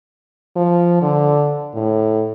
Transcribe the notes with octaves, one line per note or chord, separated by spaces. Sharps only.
F3
D3
A2